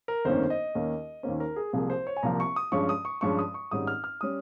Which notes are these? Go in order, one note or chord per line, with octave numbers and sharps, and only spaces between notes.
A#4
G1 F2 D#3 A#3 C#4 C5
D#5
D#2 D#3 A#3 C#4
D#2 D#3 A#3 C#4 C5
A#4
G#4
C2 C3 F3 A#3 G#4
C5
C#5
G#5
C2 C3 F3 A#3 A#5
C#6
D#6
G2 F3 G#3 C#4 C#6
D#6
C#6
G2 F3 G#3 C#4 C#6
D#6
C#6
G#1 G#2 G3 C#4 D#6
F6
F6
G3 C#4 D#6